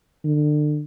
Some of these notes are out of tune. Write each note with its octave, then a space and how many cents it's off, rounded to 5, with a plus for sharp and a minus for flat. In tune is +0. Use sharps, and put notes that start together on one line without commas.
D3 +30